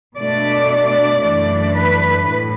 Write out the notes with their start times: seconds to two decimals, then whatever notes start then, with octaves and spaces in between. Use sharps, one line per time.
0.17 B2 A3 D4 D5
1.22 F#2 E3 A3 D4 D5
1.75 B4
2.27 A2